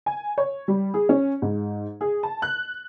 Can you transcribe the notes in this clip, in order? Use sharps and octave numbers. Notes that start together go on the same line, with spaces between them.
G#5
C#5
G3
G#4
C#4
G#2
G#4
A5
F#6